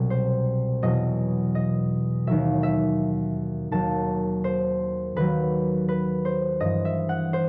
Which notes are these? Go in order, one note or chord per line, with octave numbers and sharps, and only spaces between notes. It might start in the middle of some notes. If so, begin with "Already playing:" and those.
Already playing: C2 B2 F#3
C5
E2 B2 F#3 D#5
D#5
D#2 D#3 F#3 E5
E5
D#2 D#3 F#3 A5
C5
D#2 D#3 F#3 B4
B4
C5
G2 E3 D#5
E5
F#5
C5